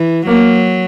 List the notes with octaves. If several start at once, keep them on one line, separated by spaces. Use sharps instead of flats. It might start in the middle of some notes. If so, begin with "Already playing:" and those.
Already playing: E3
F#3 A#3